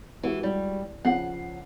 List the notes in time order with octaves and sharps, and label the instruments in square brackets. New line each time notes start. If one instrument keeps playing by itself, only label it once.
[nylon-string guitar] E3 [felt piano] G#3 F#4 G4
[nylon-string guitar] G3
[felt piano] C#3 F3 C7 [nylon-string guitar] F#5